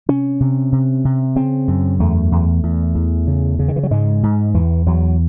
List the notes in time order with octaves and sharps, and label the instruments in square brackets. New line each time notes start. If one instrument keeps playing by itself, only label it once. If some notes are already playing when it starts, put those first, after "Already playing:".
[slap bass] C3 C#4
C3
C3
C3
C#3 C4
F#2
E2 A3
E2
E2
E2
C#3
C#3
D#3
E3
F#3
G#2 G#3
G#2
E2 E3
E2 F#3